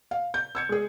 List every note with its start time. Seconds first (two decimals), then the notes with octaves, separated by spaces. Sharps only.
0.11 F5
0.34 G6
0.55 E6 G#6 C#7
0.69 G#3 G#4